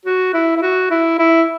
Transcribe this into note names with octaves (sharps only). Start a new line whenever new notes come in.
F#4
E4
E4
F#4
E4
E4